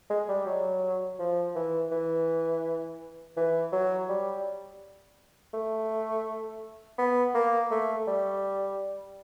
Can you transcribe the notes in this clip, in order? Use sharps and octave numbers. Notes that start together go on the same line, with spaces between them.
G#3
G3
F#3
F3
E3
E3
E3
F#3
G3
A3
B3
A#3
A3
G3